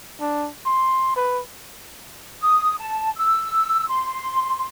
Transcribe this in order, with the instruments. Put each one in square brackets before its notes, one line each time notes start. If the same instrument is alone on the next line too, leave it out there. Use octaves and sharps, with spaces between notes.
[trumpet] D4
C6
B4
[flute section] D#6
A5
E6
C6